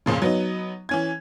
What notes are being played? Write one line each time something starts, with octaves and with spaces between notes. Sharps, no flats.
F2 A#2 C#3
F#3 B3 D#4
E3 C#4 G#6